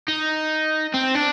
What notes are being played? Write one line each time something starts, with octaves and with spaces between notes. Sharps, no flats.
D#4
C4
D4